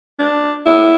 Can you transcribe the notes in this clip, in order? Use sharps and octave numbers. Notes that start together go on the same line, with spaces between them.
D4
E4